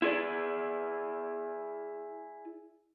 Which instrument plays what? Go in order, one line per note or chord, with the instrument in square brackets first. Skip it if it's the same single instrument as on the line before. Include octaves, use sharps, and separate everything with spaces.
[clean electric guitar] E4 G#4 D5